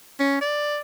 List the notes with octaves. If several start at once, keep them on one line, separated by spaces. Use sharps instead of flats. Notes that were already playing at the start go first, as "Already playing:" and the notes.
C#4
D5